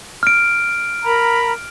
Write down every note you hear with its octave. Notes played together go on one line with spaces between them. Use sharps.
F6 D7
A#4 A#5 B5